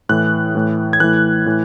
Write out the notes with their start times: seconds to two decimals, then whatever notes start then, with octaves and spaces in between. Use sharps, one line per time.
0.09 A2 E3 F#6
0.55 A2 E3
0.93 G#6
1.00 A2 E3 F#6
1.46 A2 E3